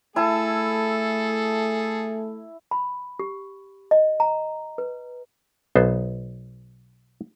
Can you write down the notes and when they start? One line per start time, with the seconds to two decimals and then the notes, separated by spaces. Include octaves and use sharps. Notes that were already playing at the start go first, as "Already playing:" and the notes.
0.16 A3 E4 G#4 A4 A5
2.71 B5
3.19 G4
3.91 D#5
4.20 A#5
4.78 B4
5.76 B1 B3 C5